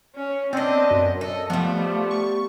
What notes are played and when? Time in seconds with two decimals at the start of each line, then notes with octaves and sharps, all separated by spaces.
0.16 C#4
0.53 B3 C4 D4 D#5
0.91 F#2
1.21 A4 D#5
1.50 F3 G3 A3 B3
2.11 C#6